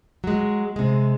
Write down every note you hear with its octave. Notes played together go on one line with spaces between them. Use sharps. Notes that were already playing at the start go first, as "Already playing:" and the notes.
F#3 G#3
C3 G#3